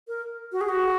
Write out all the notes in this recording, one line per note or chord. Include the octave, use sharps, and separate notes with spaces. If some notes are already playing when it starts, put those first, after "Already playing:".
A#4
F#4
G#4
F#4